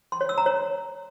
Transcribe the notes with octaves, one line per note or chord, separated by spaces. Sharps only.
C6
C#5
E6
A#5
C#5